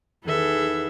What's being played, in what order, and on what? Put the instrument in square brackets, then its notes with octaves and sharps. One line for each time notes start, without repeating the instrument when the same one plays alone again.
[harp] E2 D#3 [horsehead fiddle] G#4 B4 [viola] A4 E5